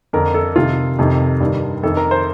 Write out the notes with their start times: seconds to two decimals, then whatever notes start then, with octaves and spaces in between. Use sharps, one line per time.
0.13 F2 D3 A#4
0.34 A4
0.56 F2 C3 D#3 F4
0.99 F2 C3 D#3
1.40 G2 D#3
1.83 F2 D#3 A4
1.97 A#4
2.11 C5